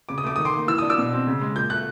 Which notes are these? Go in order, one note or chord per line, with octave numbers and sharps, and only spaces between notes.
C#3 D6
D#6
A3 D6
D#3 D#6
C6 D6
A#3
E3 E6
D4 D#6
D6 E6
B2
C4
C#3
G#3
A#2 G6
A3 F#6